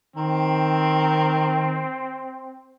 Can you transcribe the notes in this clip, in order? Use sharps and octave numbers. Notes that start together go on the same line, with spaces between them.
D#3 C4